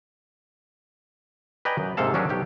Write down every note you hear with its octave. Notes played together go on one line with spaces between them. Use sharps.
B4 D5 D#5 G5 G#5 A#5
F#2
G#2 C3 A#3 A4 F5 A5
F#3 C#4 D4 G#4 A#4
B1 G4 C#5